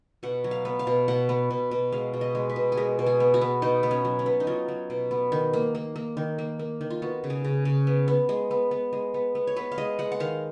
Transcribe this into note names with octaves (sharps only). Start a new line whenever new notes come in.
B2 F#5
F#3
F5
B3
F5
B2
B2 F#5
B3
B2
B2
G#3 F5
B2
D#5
G#3
B4
B2
G#4
G#3 A#4
B2
G#4
B3
F#4
B3
B2 D#4
B3
C#4
F#3
C#4
B3
D#4
F#3 F4
F#3
B2
B3
D#3
A#3
A#3
A#3
D#3
A#3
A#3
D#3
F4
B3 F#4
C#3
G#4
C#3
C#3
B3
B3
G#3
B3
B3
G#3
B3
B3
C#5
B3 B4
F5
G#3 D#5
G#3 F#5
F#5
D#3 F5